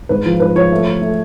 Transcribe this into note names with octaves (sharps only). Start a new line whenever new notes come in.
G#2 B4
F3
G#2 B4
F3 C#5
A3
A3
A3